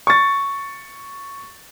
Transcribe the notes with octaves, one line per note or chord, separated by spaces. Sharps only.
C#6 A6